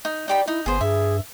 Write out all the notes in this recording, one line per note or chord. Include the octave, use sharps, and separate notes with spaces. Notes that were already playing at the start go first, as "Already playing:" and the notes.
D#4
D#4 G4 D5 B5
D#4 E4
G1 B3 G#4 C5
G2 G#4 E5